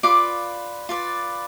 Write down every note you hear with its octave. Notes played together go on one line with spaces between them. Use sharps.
F4 B4 D5 D6
F4 B4 D5